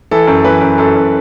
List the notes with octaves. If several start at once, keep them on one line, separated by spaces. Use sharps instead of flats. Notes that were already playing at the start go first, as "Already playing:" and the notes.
E3 A4
F#2
E3 B4
F#2
F#2 A4
F#2